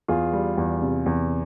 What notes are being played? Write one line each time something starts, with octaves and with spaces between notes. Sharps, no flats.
E2 F4 G#4
G3
E2
C3
E2